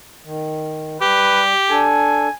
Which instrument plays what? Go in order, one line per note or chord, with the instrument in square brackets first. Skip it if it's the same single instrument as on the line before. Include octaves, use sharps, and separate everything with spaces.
[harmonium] D#3
[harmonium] G3 [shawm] G4 [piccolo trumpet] B4
[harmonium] D4 A4 [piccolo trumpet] G#5